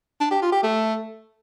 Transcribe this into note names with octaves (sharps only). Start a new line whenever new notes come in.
D4
G4
F4
G4
A3